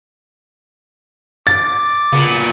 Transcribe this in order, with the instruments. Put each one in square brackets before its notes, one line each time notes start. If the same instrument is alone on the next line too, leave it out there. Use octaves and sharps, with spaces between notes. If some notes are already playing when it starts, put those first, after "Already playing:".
[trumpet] D6 [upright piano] A6
[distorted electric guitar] A#2 B3 [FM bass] C#3